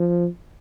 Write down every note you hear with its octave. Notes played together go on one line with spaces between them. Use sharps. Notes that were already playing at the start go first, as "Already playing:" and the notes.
Already playing: F3